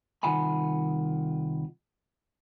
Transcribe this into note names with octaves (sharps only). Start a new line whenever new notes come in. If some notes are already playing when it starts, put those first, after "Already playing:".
C2 D#3 F4 F#5 G#5 B5